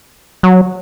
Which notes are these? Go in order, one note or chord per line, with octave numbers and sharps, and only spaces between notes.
F#3